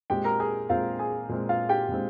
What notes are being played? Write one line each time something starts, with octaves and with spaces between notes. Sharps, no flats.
A#2 G#3 C4 G4 G5
A#4 A#5
G#4 G#5
A#2 G#3 C4 F4 F5
G#4 G#5
A#2 G#3 C4
F4 F5
G4 G5
A#2 G#3 C4